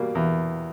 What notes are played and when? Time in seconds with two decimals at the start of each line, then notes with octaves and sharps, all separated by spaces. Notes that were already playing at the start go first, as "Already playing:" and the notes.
Already playing: B2 G3 A#3
0.15 E2